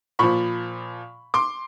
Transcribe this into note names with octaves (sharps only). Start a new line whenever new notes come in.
A#2 F3 B5 C#6
C6 D6